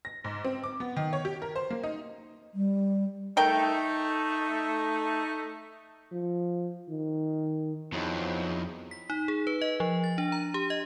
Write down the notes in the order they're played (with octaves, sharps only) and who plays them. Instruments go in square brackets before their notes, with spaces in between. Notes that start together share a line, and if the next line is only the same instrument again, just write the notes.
[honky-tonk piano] A#6
G#2
C4
D6
B3
D#3
C#5
G4
A#4
C5
A#3
D#4
[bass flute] G3
[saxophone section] A3 D#4 [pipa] A#4 G5
[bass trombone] F3
D#3
[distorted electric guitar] F2 [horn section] F3 F#3 D#4 [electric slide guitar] B3 E4 G#4
[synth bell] B6
D#4
G#4
B4
D#5
F3
A6
D4
A#5
G4
D#5